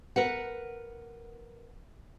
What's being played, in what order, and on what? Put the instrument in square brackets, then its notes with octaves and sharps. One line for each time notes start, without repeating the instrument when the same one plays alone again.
[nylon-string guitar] A#4 B4 F#5